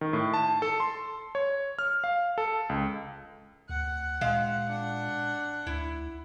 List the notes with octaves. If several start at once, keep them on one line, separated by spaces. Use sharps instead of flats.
D#3
A2
A5
A4
C6
C#5
F6
F5
A4
C#2
D2 F#5
A#2 G#3 F5
D4 F#5
D2 E4